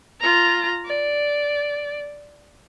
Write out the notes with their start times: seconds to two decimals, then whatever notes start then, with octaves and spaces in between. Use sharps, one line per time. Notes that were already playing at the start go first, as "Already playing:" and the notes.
0.20 F4 A#5
0.85 D5